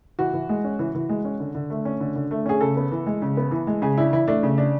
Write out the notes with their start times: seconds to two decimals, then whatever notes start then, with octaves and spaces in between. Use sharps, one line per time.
0.19 E3 F#4
0.33 E3
0.49 G#3
0.64 C#4
0.79 E3
0.95 E3
1.09 G#3
1.25 C#4
1.40 D3
1.55 D3
1.70 A3
1.85 C#4
2.00 D3
2.16 D3
2.31 A3
2.46 C#4 G#4
2.61 C#3 A4
2.76 B3
2.92 E3
3.06 G#3
3.22 C#3
3.37 B3
3.51 E3
3.67 G#3
3.82 C#3 G#4
3.98 D4 E4
4.13 E3 E4
4.28 A3 D4
4.43 C#3
4.58 D4